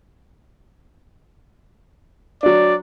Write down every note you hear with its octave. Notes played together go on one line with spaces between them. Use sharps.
F#3 D4 D5